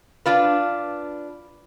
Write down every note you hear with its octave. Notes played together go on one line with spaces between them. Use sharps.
D4 F4 B4